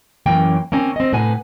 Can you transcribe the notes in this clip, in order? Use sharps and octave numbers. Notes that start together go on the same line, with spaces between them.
F#2 E3 A#3 C#4 G5
A#3 C4 C#4
C4 D#5
A2 C3 B4 F#5 G#5